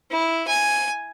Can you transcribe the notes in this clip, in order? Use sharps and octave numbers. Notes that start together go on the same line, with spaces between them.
E4
G#5